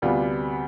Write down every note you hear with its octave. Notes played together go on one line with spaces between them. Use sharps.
D2 C3 G3 B3 D4 F4